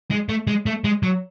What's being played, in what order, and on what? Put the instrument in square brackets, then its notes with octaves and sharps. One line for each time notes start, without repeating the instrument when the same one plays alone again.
[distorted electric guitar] G#3
A3
G#3
A3
G#3
F#3